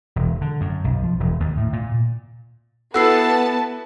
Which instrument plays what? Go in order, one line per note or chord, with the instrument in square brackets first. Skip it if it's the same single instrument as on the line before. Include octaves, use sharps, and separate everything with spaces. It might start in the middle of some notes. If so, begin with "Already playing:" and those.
[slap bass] E1
D3
F#2
B1
F3
E1
D#2
A2
A#2
[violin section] B3 A5 [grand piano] E4 F#4 [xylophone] A4 E6 C7